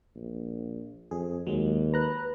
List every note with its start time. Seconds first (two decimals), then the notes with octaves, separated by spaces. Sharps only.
0.16 A#1
1.11 F2 G#4
1.47 D#2 F#3 G#3
1.94 B4 A#5 F#6